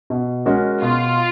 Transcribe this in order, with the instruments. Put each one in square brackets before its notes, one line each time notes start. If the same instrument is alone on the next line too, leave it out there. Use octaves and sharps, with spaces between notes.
[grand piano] B2
G#3 C#4 F#4 A#4
[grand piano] B2 [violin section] F4